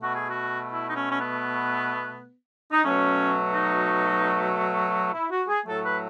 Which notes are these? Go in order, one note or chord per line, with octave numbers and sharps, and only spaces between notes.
B2 A3 F#4
G#4
F#4
E4
D#4
C#4
C#4
B3
D#4
B2 F#3 A3 C#4
D#4
E4
F#4
G#4
A2 F#3 A3 A4
B4